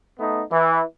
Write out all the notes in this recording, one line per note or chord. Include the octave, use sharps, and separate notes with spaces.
A3 B3 D#4
E3